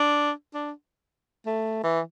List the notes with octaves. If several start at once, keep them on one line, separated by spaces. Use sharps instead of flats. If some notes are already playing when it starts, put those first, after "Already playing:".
Already playing: D4
D4
A3
E3